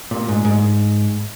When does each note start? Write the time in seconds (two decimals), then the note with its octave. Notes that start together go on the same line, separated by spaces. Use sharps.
0.11 A#2
0.28 G#2
0.45 G#2